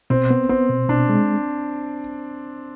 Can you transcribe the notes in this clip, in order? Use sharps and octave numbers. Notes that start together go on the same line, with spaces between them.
B2 C4
B3
B3 C4
B2
B2 D4
G#3